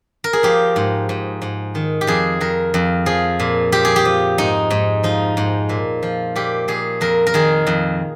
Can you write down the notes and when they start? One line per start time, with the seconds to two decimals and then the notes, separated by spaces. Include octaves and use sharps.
0.24 A#4
0.33 G#4
0.43 F3 G4
0.76 G#2
1.09 G#2
1.42 G#2
1.75 D#3
2.01 G4
2.07 F2 G#4
2.41 F2 A#4
2.74 F2
3.06 F3 G#4
3.40 A#2
3.72 A#2 G4
3.85 G#4
3.96 G4
4.05 F3
4.38 G#2 D#4
4.71 G#2
5.03 F3 D#4
5.37 G#2
5.69 A#2
6.03 F3
6.36 A#2 G4
6.68 A#2 G#4
7.01 F2 A#4
7.27 A#4
7.34 D#3 G#4
7.67 F2